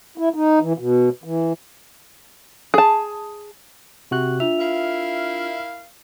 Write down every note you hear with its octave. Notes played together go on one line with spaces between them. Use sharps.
E4
D#4
E3
B2
E3
G#4 A5
C3 F#4 F#6
D4 F4 E5 F7
E4 A#4 F5